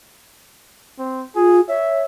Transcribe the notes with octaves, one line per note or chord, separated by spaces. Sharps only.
C4
F4 G#4
C#5 E5